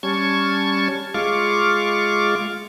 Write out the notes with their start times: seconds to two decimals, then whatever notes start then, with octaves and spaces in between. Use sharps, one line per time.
0.03 G3 C#4 A5 C#6 G#6
1.14 G#3 F4 F5 C#6 D6